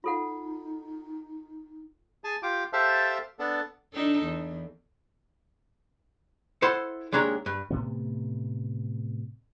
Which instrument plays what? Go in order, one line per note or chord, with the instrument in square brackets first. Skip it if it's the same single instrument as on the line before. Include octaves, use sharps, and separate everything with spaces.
[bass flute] D#4 [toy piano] F4 A4 F#5
[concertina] G#4 G#5 A5
F4 G4 D6
G4 A4 C5 E5 F5 A5
B3 D4 A4
[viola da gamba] D4 D#4 A4
E2
[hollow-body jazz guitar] E4 A4 C5 F#5 C6
D#2 G#3 D4 C#5 A#5
G2
[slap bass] A2 C3 B3